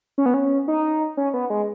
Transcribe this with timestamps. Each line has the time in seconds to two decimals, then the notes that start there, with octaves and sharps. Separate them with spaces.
0.18 C#4
0.26 B3
0.34 C#4
0.68 D#4
1.17 C#4
1.34 B3
1.50 G#3